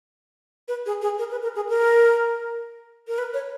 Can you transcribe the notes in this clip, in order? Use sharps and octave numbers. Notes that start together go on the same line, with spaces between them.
B4
G#4
G#4
A#4
B4
A#4
G#4
A#4
A#4
B4
C#5